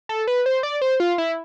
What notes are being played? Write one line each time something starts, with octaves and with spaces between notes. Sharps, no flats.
A4
B4
C5
D5
C5
F4
E4